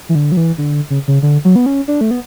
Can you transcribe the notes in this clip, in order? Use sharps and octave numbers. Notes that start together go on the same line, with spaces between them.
E3
D3
F#3
E3
D3
C#3
C#3
D3
F#3
B3
C#4
D4
A3
B3